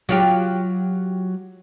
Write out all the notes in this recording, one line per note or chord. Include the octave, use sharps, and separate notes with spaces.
F#3 F4 G4